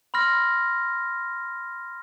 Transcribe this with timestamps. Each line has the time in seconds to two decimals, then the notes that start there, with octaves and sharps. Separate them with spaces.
0.14 B5 C6 F6 A#6